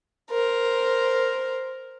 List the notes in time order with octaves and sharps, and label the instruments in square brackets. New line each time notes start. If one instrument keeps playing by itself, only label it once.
[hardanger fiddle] A#4 C5